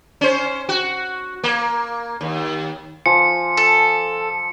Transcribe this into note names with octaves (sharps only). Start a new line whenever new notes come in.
C#4 C5
F#4
A#3
D#2
F3 G#5 C#7
A4